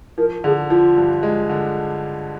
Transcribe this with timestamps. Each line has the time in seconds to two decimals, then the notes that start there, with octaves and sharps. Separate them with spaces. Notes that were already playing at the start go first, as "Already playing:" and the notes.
0.18 F3 A#4
0.44 D3 G#4
0.70 F3 F4
0.97 G2
1.23 G#3
1.49 D3